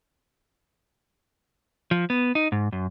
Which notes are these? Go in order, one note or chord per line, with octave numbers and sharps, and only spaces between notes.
F3
B3
D#4
G#2
F#2